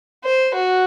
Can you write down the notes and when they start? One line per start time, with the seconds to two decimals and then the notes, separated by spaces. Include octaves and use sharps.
0.24 C5
0.54 F#4